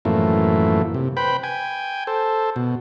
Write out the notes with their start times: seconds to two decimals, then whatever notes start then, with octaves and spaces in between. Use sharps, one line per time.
0.05 F#2 A2 E3 F3 A3 A#3
0.94 C3
1.17 B4 C5 G5 B5
1.43 G5 G#5
2.07 A4 C5
2.56 B2